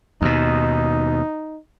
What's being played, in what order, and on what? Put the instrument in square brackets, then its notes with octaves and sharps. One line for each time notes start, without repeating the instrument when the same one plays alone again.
[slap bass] D#2 B2 [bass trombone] D#4